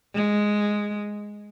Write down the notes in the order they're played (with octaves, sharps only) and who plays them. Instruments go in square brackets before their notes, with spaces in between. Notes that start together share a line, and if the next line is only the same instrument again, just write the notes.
[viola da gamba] G#3